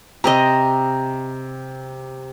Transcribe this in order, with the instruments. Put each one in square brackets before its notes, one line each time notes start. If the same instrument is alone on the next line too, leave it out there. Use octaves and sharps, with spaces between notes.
[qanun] C3 C4 D#5 [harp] A#5